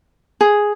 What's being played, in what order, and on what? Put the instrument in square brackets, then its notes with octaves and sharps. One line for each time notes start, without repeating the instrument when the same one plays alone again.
[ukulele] G#4